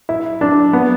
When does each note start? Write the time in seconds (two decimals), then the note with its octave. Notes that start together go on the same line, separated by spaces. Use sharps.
0.09 E4
0.41 D4
0.73 B3